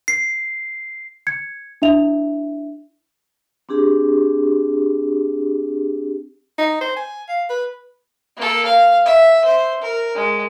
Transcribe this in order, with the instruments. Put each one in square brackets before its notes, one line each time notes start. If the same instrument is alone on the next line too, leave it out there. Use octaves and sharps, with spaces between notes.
[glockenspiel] C7
[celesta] G#6 C#7
D4 E4 E5 F7
[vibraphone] C4 D4 G4 G#4
[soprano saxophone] D#4
C5
G#5
F5
B4
[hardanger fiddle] A#3 A4
F5
E5
C5
A#4
G#3